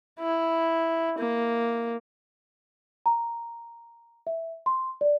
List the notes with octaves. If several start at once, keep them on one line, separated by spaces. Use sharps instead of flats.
E4
A#3
A#5
E5
C6
D5